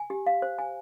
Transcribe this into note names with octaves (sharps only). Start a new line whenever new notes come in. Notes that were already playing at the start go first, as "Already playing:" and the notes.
Already playing: G#5
G4
F5
C5
G#5